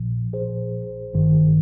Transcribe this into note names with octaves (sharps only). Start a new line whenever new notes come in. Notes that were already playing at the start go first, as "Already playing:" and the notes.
Already playing: A#1 A#2 F3
G#4 C5
G#1 G2 D#3